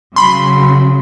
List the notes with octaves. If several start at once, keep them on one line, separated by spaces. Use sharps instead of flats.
C#3 F#3 B5 C6